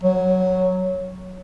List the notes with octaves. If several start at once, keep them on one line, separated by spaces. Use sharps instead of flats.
F#3